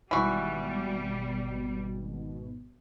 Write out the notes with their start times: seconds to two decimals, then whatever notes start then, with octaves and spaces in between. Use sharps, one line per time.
0.11 G#1 B2 E3 G3 F#4